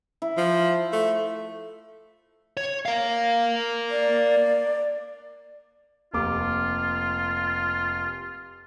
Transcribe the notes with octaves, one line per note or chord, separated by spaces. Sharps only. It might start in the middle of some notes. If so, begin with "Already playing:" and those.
E4
F3
A3
C#5
A#4 F5
D5
F1 A#3 F4 D6